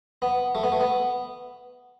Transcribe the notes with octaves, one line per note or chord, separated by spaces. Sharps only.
B3
A3
B3
A3
B3